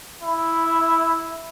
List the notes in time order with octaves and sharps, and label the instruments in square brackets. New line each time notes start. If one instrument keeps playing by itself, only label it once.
[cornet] E4